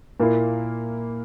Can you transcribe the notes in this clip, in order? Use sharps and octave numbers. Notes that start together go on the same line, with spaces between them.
A#2 A#3 E4